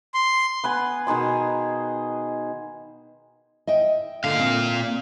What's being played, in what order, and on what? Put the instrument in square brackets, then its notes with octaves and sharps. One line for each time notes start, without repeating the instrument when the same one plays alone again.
[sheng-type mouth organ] C6
[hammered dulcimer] B3 B4 G#5
B2 D#3 G#4 C6
[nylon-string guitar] D#5 E5 G5
[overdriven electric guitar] A#2 F5 [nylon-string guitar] D3
[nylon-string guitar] C4